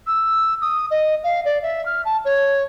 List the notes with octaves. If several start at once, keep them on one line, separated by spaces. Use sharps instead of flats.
E6
D#6
D#5
F5
D5
E5
F6
A5
C#5